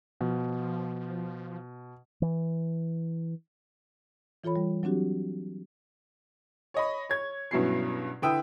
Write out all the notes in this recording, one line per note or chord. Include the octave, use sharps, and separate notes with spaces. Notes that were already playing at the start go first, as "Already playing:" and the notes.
B2 F3
E3
E3 F4 A4 C#5 B5
G3
F#3 C4 D4 F#4 G4
C#5 D#5 B5
C#5 G#6
G2 B2 F#3 C#4 E4 C7
D3 E4 B4 G5 D#6 E6